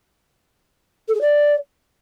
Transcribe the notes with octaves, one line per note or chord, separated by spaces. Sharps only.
A4
G#4
D5